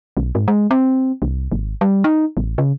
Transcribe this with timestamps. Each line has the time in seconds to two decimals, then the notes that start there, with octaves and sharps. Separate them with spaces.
0.17 B1
0.35 G#2
0.48 G#3
0.71 C4
1.22 C2
1.52 G#1
1.81 G3
2.04 D#4
2.37 A1
2.58 C#3